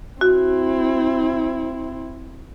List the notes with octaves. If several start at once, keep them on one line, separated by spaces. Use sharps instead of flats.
C4 E4 F#4